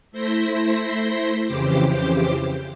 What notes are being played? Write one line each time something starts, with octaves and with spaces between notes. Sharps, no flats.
A3 E4 C5 C6 A#6 B6
F2 C#3 E3 G4 C5 D6